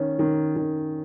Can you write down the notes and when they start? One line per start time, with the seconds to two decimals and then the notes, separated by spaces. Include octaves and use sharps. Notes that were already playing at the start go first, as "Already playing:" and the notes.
Already playing: D#3 C#4
0.19 D#3
0.56 D#3